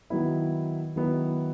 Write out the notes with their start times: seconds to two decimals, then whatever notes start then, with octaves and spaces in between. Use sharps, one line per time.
0.10 D#3 F#3 B3 E4
0.96 D#3 F#3 B3 E4